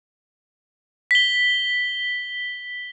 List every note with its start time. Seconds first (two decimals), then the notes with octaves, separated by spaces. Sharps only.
1.11 B6 G7